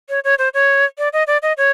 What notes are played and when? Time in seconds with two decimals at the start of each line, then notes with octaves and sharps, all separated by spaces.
0.09 C#5
0.24 C#5
0.39 C5
0.54 C#5
0.98 D5
1.13 D#5
1.27 D5
1.42 D#5
1.57 C#5